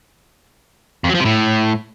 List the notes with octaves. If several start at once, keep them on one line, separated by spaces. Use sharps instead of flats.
F2
F#3
F3
C3
A2